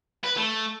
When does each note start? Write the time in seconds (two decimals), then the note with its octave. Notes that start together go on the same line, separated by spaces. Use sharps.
0.24 B4
0.37 A3